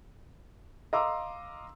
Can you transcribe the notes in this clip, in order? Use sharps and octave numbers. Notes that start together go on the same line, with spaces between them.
D#5 F5 A#5 C6 D6 E6